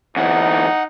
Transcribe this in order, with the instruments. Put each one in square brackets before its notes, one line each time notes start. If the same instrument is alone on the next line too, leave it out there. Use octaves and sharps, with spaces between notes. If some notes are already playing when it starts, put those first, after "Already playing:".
[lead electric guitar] D2 E3 [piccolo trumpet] D#4 [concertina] F#5